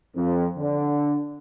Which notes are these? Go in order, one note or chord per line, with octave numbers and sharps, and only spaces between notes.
F2
D3